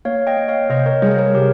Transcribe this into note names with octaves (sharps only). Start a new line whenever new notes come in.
A#3 C#5 F5
D#5 G5
A#3
C#5 F5
C3 C5 D#5
A#4 C#5
G3 G#4 C5
A#4 C#5
C3 G4 A#4